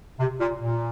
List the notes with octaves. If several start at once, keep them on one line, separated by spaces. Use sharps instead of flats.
C3
A#2
A#2